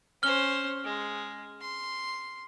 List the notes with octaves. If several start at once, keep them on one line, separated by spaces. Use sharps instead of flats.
C#4 C5 F6 G7
G#3
C6